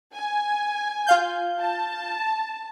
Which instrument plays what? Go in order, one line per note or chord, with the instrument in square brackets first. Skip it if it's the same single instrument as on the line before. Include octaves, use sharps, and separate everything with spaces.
[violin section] G#5
[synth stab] F4 F5 G6
[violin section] A5